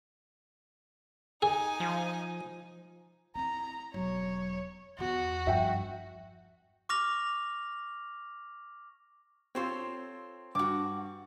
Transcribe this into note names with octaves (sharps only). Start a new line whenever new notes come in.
D#4 G#4 G#5
F3
C4 E4 A#5
E1 F#3 C#5
E2 D3 F#4
G2 F3 E5 G5
C#6 D6 F6 A#6 F7
C4 F4 A4 C5 C#5
G2 F#4 D6